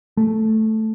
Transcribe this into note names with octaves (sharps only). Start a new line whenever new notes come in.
A3